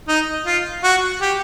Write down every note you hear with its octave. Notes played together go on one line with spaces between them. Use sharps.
D#4
F4
F#4
G4